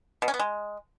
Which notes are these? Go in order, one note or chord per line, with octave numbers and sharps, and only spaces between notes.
B2
C#4
B3
G#3